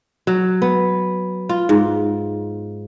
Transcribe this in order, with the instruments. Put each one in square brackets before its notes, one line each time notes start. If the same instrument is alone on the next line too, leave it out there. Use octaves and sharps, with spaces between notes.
[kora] F#3
B3
F4
G#2